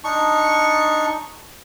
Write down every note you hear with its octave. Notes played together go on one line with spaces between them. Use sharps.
D4 D#4 C#6